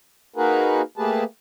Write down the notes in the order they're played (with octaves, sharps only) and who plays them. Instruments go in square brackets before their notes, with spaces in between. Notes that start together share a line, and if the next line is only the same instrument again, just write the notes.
[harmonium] A#3 D#4 F#4 G#4 A#4 B4
A3 A#3 G4 G#4 B4 A5